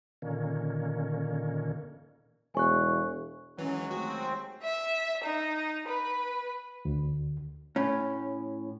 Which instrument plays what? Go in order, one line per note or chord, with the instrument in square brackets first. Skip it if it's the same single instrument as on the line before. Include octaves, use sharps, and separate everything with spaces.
[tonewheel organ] A#2 D3 D#3 A#3 C#4
[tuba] E1 [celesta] G#5 C#6 F#6
[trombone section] D#2 F#3 G#3 [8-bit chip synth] E3 [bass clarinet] C#4
[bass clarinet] A3 [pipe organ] C4 [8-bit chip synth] F#4
[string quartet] E5
D#4
B4
[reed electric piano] D2
[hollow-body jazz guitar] A2 C#4